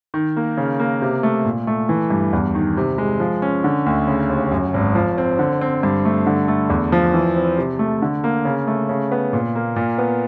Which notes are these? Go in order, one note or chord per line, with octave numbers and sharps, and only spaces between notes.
D#3
A#3
C#3
A#3
C3
A3
A#2
A3
E3
G2
E2
D#3
C3
G#3
F3
C#4
D3
D2
C#3
D#2
F#2
G#1
F3
C4
D3
C4
G2
A3
D3
A3
E2
F3
E3
C4
C3
A3
D3
A#3
C#3
A3
C#3
B3
A#2
A#3
A#2
B3